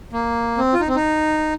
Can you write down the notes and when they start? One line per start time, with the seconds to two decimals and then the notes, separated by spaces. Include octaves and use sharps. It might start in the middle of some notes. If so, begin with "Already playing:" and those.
0.13 A#3
0.58 C4
0.74 F4
0.81 D#4
0.88 C4
0.96 D#4